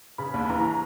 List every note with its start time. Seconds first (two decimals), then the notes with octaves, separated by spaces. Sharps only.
0.18 C#3 B5
0.34 D#2
0.45 B5
0.49 E3 A#5